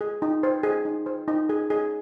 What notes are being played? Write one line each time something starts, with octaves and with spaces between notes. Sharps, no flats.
G#4
D#4
C5
G#4
D#4
C5
D#4
G#4
G#4